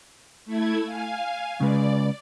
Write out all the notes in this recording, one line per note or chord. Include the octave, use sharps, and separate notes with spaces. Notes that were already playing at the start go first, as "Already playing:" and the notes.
A3 E4 G#6
F5 G#5
C#3 G#3 B4 D5